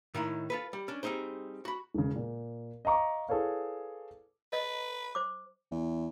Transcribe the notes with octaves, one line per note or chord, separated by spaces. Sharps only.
A2 D#3 D#4 E4
F4 A4 B4
G3
C#4 D4
G3 C4 D#4 G#4 C5
F#4 B5
E1 C#3
A#2
D#5 F5 A#5 C#6 D6
E4 G#4 A4 B4 C#5 F5
B4 D#5
C5 D6
E2